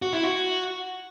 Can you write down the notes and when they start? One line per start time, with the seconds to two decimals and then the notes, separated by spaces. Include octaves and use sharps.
0.02 F#4
0.13 E4
0.24 F#4